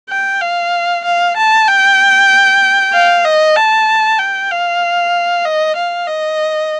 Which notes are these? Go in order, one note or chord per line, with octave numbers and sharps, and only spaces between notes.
G5
F5
F5
A5
G5
F5
D#5
A5
G5
F5
D#5
F5
D#5